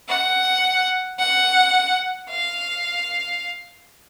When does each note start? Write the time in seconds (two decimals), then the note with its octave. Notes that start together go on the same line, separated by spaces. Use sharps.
0.09 F#5
1.19 F#5
2.30 F5